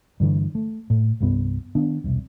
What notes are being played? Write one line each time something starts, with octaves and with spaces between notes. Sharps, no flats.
G2 D3 E3
A3
A2
C2 G2 B3
D#3 B3 D4
E1 C2